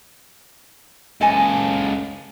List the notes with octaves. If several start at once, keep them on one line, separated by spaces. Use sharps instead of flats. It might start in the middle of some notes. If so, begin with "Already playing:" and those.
C#2 A4 D#5 G#5